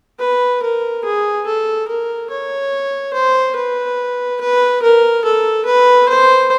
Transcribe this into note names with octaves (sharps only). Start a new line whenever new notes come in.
B4
A#4
G#4
A4
A#4
C#5
C5
B4
B4
A#4
A4
B4
C5